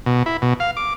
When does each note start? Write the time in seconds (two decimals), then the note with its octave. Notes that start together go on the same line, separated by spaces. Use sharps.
0.06 B2
0.26 E4
0.42 B2
0.60 F5
0.77 D6